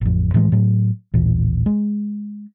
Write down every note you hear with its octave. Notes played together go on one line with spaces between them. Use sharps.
A1 F2
A2 E3 F3 G#3
A2 F#3
A1 D#2 A#2 E3
G#3